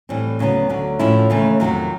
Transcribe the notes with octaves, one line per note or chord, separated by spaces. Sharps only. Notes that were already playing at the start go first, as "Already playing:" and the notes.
A2 E3 G3 C4
D2 C#3 F#3 B3
D2 D3 F#3
A2 F3 A3 C#4 E4
D#2 C#3 E3 A3
F2 C3 D#3 F#3